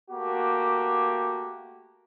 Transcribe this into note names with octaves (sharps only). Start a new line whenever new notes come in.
A3 A#3 F#4 G4